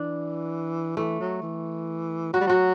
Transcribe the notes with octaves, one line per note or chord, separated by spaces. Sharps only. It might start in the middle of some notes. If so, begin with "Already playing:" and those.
Already playing: E3 D4
E3 A3
F#3
E3
F#3 F#4
G3
F#3 F#4